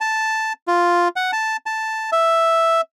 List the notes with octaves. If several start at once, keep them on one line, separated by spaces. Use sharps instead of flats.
A5
F4
F#5
A5
A5
E5